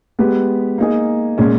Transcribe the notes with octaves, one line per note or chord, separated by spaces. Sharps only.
G#3 B3 G4 B4
A#3 D#4 G#4
A#2 G#3 C#4